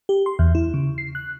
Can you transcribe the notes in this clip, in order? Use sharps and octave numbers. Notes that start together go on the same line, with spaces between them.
G4
C6
E2
E4
C#3
C7
F#6